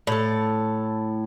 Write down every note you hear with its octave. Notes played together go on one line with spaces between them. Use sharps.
A2 A4